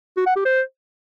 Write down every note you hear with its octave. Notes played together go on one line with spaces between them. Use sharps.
F#4
F#5
G4
C5